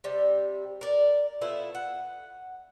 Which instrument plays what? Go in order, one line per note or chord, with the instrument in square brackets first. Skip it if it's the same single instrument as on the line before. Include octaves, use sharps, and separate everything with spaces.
[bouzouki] C3 G3
A#4 D5
A3 B3 E4 F4
F#5